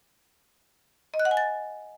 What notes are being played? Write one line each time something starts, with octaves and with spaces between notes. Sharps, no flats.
D#5
F#6
F#5
G#5
A6